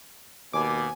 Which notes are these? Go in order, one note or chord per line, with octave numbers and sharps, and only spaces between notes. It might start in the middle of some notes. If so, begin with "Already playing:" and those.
D#2 B2 G#5 D6